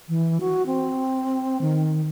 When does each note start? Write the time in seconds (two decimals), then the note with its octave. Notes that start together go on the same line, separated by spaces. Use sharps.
0.09 E3
0.40 F#4
0.66 C4
1.61 D#3